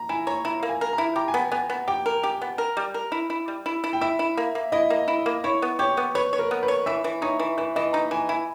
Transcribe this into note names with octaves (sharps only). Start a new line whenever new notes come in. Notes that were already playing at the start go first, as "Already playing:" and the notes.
Already playing: A#5
E4 G#5
C#5 A#5
E4 A#5
A#3
G#5
A#4
A#5
E4
G4 A#5
G#5
B3
G5
B3 G#5
B3
G4 G5
A#4
G4
B3
A#4
G3
A#4
E4
E4
G3
E4
E4
G5
E4 E5
E4
A#3
A#3
E4 D#5
A#3
E4
A#3
E4 C#5
B3
G4 C#5
B3
B4 C#5
C#5
A#4
B3
B4
C#5
E3 E5
E3
D#4 C#5
E3
E3 B4
E3 D#5
D#4 A#5
E3 G#5
E4 G#5